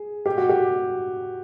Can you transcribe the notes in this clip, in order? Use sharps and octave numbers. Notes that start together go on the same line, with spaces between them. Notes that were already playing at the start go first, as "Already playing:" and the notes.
Already playing: G#4
G4
F#4
G4